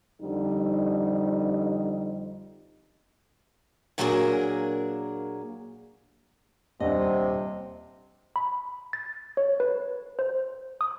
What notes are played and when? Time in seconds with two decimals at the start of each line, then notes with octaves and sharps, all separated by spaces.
0.21 F2 D3 G3 D#4
3.98 A#2 F#3 A#3 D4 G#4 A#4
6.80 D#1 C3 D4 D#5 F#5
8.36 B5
8.93 A6
9.37 C#5
9.60 B4
10.19 C5
10.81 D#6